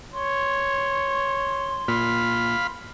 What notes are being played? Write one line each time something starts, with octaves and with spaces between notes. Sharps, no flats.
C#5 C6
A#2 F5 B5